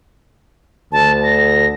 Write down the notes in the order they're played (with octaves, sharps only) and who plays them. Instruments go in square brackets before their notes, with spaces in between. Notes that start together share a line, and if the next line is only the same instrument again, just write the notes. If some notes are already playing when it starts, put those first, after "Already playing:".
[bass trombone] D2 [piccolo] A5
[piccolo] A#6